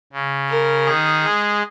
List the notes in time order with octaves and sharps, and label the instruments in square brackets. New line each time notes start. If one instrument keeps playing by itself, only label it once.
[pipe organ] C#3
[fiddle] A#4
[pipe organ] D#3 [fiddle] G#4
[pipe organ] G#3